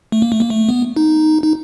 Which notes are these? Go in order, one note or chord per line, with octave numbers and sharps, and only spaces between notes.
A3
A#3
A3
A#3
A3
B3
D#4
D#4